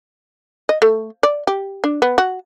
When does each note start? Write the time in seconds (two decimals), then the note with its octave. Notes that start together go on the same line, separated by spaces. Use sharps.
0.69 D#5
0.82 A3
1.23 D5
1.47 G4
1.84 D4
2.02 B3
2.18 F#4